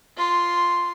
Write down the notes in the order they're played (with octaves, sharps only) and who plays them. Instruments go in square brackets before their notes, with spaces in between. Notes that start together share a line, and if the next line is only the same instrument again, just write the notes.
[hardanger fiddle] F4 C6